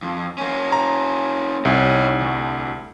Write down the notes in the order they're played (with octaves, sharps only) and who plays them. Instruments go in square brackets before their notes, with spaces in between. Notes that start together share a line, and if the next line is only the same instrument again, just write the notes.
[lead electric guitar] F2
A#3 C#4
[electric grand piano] A#5
[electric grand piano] C2 [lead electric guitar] D#4 C#5
[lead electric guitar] D2